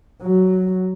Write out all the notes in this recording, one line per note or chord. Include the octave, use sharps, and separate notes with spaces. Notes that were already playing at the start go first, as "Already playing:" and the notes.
F#3